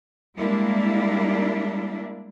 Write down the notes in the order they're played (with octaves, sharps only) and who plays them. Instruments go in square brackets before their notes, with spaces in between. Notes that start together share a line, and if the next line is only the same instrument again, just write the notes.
[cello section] G3 G#3 A#3 D4 E4